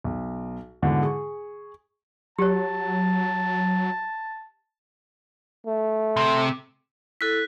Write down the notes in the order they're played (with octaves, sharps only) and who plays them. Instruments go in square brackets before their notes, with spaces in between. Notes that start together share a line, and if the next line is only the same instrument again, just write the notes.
[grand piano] B1
G#2 B2 D3 E3
G#4 C#6
[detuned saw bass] F#3 [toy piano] G4 C#5 [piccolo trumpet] A5
[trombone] A3
[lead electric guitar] C3
[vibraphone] E4 A4 [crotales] F#6 B6